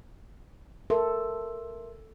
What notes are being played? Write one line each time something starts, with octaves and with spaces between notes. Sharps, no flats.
A4 A#4 E5 C6